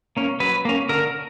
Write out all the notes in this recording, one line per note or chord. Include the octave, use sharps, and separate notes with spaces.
A#3 C#4
F#3 B4
A#3 C#4
D3 A#4